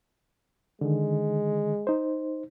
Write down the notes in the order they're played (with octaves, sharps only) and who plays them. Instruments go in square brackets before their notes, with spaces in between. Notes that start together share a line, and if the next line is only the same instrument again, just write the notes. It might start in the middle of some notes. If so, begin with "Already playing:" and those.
[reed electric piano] D3 D#3 [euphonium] G#3
[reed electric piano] D#4 C5